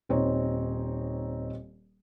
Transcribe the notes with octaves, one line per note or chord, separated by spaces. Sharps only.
D#1 C4 D#4 C#5